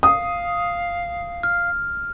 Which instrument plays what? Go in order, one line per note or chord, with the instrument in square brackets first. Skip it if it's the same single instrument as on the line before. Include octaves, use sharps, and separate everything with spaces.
[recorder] F5 [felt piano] D#6
[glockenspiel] F6